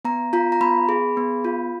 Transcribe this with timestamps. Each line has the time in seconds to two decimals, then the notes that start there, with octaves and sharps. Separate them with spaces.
0.05 B3 A#5
0.33 F4 A#5
0.52 A#5
0.61 B3 B5
0.89 G#4
1.17 B3
1.45 F4